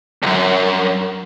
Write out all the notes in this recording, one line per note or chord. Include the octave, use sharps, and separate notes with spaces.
C#2 F#2